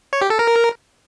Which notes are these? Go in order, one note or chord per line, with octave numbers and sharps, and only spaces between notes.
C#5
G4
A4
A#4